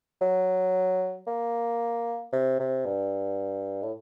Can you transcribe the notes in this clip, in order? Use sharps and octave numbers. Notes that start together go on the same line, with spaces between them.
F#3
A#3
C3
C3
G2
A2